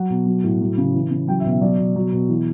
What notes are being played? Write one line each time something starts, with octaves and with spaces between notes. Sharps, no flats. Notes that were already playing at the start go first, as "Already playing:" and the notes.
Already playing: F#3 F#5
B2
F#3
A2
F#3
C#3
E3
C#3
F#3 G5
E5
B2
E5
F#3 D5
B2
F#3
B2
E3